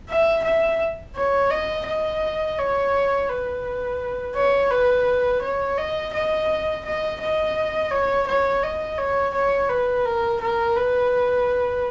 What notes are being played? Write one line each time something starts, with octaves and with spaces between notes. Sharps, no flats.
E5
E5
C#5
D#5
D#5
C#5
B4
C#5
B4
C#5
D#5
D#5
D#5
D#5
C#5
C#5
D#5
C#5
C#5
B4
A#4
A#4
B4